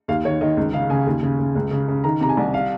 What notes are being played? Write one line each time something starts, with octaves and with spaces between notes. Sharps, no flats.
D#2 F5
D#3 C#5
D#3 D#5
C#2
C#3 F5
C#3 G#5
D#2
C#3
C#3
C#2
C#3
C#3
D#3 A#5
C3 A#5
G#5
C2
F5